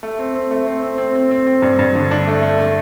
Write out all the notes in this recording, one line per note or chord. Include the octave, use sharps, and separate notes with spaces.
A3
C4
C4
A3
C4
C4
C4
C4
C4
C4
G2
G2
D3
D4
A3
A3
A3